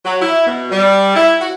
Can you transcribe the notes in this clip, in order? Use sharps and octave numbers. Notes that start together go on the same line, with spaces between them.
F#3
E4
B2
G3
E4
F#4